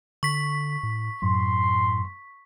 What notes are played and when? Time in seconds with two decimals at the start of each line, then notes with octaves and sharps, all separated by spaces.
0.23 D3 C#6 B6
0.83 A2
1.22 F#2 A2 C6